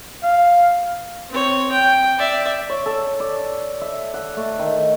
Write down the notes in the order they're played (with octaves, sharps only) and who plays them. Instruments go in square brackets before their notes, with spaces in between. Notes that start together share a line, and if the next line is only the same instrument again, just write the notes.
[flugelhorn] F5
[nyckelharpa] C4 C#5
G5
D5 E5
[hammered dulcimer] C#5
A4
D5
E5
F#5
A3
D#3